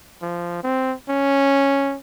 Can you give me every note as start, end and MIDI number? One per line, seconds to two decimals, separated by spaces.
0.22 0.63 53
0.63 0.94 60
1.09 1.97 61